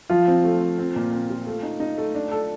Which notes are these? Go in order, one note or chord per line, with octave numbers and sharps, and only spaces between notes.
F3 F4
C4
A3
C4
C4
A#2
C4
F4
A3
D#4
D#4
A3
D4
A4